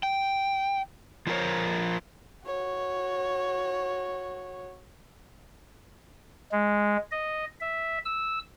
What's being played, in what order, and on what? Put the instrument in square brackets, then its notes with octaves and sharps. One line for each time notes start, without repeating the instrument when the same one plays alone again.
[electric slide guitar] G5
F3 E4 F4 A#4 C5 C#5
[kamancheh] F#4 C#5
[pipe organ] G#3
D#5
E5
E6